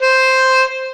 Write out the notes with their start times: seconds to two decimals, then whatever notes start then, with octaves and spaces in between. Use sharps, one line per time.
0.02 C5